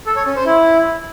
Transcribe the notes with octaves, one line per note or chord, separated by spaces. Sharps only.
A4
C#5
C#4
C5
E4